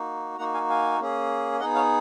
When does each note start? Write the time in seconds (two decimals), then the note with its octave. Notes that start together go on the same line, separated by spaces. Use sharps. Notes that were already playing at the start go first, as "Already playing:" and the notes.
Already playing: A#3 D#4 F#4
0.38 A#3 D#4 F#4 F#5 A#5
0.54 F5 G#5
0.70 F5 G#5
1.00 A#3 C#4 G#4
1.60 B3 D#4 G#4 D#5 F#5
1.75 C#5 F5